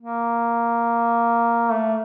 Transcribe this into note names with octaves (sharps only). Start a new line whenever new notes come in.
A#3
A3